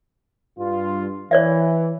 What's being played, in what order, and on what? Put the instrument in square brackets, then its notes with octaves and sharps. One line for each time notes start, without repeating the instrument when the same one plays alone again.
[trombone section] G2 F4
[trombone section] E3 [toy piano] C#5 D5 E5